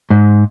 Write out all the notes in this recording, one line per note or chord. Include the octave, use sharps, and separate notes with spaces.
G#2